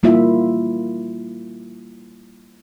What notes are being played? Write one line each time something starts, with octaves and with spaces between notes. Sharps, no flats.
G3 A#3 E4 F4 E5